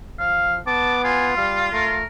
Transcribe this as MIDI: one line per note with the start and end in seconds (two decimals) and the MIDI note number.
0.19 0.61 53
0.19 0.56 77
0.67 1.35 59
0.67 0.95 81
0.67 1.00 86
1.04 1.98 65
1.04 1.26 80
1.37 1.70 55
1.37 1.64 77
1.73 2.05 57
1.73 2.04 70